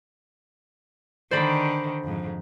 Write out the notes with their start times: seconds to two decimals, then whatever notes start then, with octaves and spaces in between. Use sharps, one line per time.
1.31 D3 D#3 C5 D5 B5
2.04 F2 G#2